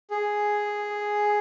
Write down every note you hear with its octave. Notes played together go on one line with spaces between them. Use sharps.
G#4